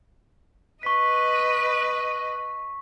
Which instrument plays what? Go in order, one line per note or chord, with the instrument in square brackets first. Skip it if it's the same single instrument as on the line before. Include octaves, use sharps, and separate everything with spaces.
[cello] B4 D#5 [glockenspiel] C#6 B6